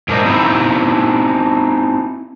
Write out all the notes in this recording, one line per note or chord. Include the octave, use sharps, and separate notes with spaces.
G#2 D4 A#4 C5 D#5
C4 D#4 E4